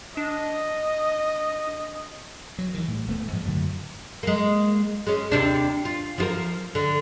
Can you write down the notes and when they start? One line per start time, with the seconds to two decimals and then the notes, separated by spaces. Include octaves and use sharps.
0.17 D4 D#5
2.59 F#3
2.74 D#3 E3
2.88 A2 G3
3.07 D#1 A3 B3
3.33 G#2 F3 G3
3.46 F#2 D3 F#3 A3
4.23 G#3 A#3
5.07 G#3 C#4
5.31 D#2 C3 D4
5.85 F4
6.18 F3 F4 A#4
6.75 D3